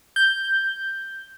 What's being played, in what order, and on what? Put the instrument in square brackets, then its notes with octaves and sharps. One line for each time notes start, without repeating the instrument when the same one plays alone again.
[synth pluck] G6